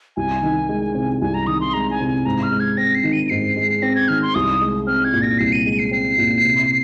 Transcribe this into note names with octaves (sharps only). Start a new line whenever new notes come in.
C2 G#5
D#3
G#3
C3
C2 G#5
A#5
D#3 D#6
C6
G#3 A#5
G#5
C3
G#5
G#2 A#5
F6
G#3
G#6
C4 A#6
C7
D#3
D#7
D#7
G#2 C7
G#3
C4 A#6
G#6
D#3 F6
C6
C2 D#6
G#3
C4 F6
G#6
A#2
A#6
C2 C7
D#7
G#3 D#7
C7
C4 C7
A#2
C3